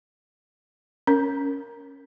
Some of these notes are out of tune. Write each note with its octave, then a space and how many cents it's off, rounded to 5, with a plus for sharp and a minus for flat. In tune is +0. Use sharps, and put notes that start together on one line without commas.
C#4 +0 A#4 +0